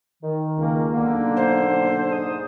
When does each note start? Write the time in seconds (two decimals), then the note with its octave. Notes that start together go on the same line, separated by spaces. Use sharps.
0.23 D#3
0.57 C#2 G#3 A#3
0.92 B1 D3 A#3
1.36 C5
2.10 G#2 D#6